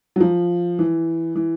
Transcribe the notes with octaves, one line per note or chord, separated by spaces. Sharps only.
F#3
F3
E3
E3